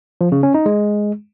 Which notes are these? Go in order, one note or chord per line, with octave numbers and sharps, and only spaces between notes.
F3
C#3
C#4
D#4
G#3